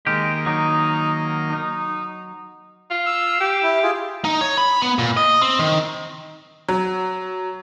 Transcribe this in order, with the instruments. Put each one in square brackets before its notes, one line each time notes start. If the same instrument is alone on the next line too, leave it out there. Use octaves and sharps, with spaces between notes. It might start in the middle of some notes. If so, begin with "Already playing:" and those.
[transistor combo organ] D#3 A#3 [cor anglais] G#3 [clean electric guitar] G4
[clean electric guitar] F#3 [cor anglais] D#4
[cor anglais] D#4
[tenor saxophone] F4
[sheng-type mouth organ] E6
[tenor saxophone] G4
[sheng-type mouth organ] E4
F4 G#4
[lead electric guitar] D#4
C#5
B5
B3
A#2
D#5
C4
D#3
[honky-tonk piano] F#3